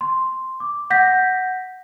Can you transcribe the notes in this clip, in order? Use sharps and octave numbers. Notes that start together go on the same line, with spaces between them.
C6
D6
F#5 G6 A#6 B6